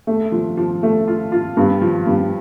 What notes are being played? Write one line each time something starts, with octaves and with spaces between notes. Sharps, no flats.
A3
F3
F3
A3
F4
F4
G2
F3
G2